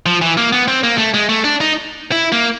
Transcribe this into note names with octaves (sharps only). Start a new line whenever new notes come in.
F3
E3
A#3
B3
C4
A#3
A3
G#3
A3
D4
D#4
E4
A#3